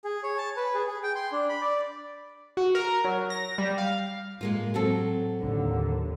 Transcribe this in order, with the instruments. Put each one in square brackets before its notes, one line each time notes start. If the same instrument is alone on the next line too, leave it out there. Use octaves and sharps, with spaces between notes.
[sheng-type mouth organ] G#4
C#5
A5
B4
G#4
G#4
G5
C6
D4
B5
D5
[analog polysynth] F#4
A#4
F#3
A#6
G3
F5
[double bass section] A2 [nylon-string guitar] G#3 A#3 F4
[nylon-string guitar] F#3 C4 A4
[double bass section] D#2 A2 D3